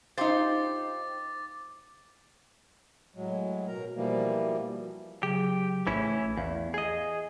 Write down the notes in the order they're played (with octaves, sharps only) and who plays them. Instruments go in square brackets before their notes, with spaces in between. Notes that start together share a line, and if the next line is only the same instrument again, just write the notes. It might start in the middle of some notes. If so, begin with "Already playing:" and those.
[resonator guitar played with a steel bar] D#4 C5 [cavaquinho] F4 G4 [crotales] D6 A6
[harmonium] A2 F#3 G#3
B2 A#4 A#5
B2 E3 F3 G3 A#3
[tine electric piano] C#3 F#3 G#4 [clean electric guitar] G4
[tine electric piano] A#1 A2 A3 [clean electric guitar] E3 C#4 E4
[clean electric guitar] E2 [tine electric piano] F5
[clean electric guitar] G#4 D#5